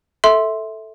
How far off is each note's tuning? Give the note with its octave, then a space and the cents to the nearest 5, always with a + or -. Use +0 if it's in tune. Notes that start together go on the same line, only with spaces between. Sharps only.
A4 +0 E5 -15 C6 +0